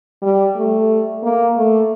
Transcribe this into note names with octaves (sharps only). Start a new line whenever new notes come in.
G3
A3
A#3
A3